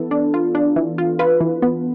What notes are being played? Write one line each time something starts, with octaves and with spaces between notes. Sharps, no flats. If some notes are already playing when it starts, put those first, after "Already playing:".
Already playing: E3 B3 A4
D4
F4
D4
E3
F4
F4 B4
E3
B3